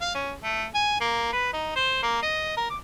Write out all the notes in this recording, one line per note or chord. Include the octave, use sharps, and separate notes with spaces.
F5
C#4
A3
G#5
A#3
B4
D#4
C5
A#3
D#5
A#4
D6